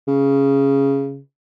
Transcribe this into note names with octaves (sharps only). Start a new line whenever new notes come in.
C#3